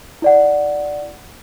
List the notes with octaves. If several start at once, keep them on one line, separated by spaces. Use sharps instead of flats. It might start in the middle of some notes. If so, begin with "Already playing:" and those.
E4 D5 F#5